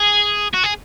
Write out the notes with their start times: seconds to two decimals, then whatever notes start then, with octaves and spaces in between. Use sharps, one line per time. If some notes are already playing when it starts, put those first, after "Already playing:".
Already playing: G#4
0.54 F#4
0.64 G#4